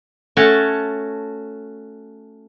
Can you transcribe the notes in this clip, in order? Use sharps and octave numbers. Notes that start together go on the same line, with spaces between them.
A3 C#4 F#4 C#5 A5